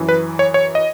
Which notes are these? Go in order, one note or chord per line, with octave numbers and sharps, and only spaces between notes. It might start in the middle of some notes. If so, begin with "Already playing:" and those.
Already playing: F#2 E3
B4
C#5
C#5
D#5